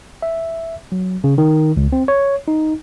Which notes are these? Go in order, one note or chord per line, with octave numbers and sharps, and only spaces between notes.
E5
F#3
C#3
D#3
C#2
C4
C#5
D#4